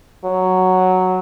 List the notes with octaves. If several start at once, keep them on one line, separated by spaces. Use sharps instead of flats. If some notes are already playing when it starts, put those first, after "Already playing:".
F#3